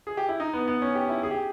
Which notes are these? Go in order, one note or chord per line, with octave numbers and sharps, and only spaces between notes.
G#4
G4
E4
D#4
B3
B3
C#4
G4
E4
G#4
G4